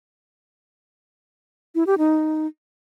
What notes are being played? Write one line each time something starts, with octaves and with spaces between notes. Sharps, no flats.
E4
G4
D#4